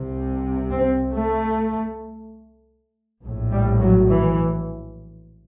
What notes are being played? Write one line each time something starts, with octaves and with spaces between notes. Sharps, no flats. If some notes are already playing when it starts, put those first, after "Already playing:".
Already playing: C2 C3
C4
A3
A#1 A2
G3
F#3
E3